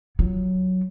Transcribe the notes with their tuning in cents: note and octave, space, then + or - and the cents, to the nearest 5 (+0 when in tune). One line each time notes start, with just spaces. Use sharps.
F#3 +0 F4 -15